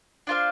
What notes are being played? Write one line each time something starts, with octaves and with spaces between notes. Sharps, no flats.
D4 F4 C5 F5